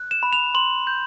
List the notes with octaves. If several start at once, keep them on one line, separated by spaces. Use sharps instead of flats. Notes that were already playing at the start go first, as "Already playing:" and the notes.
Already playing: F#6
E7
B5
F7
C6 F#7
G6